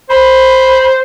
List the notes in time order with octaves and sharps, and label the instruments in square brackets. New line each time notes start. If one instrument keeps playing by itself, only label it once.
[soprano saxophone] C5 [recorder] B5